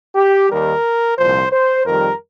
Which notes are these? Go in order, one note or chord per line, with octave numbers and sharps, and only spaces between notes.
G4
D#2 D#3 G3 A#4
C2 A#2 F3 C5
C5
F2 D#3 G3 A#4